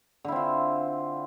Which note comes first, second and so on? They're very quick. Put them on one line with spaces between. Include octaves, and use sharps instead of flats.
D3 E4 C4 F4